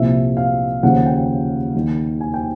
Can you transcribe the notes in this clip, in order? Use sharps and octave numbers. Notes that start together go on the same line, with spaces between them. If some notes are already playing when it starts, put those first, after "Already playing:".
Already playing: C2 A#2 F3 E5
F5
D#2 C#3 F3 F#5
G5
D#2 D#3
G#5
G5